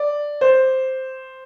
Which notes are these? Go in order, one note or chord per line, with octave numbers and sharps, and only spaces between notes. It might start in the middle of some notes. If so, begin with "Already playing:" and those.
Already playing: D5
C5